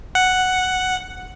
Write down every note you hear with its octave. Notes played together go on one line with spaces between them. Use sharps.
F#5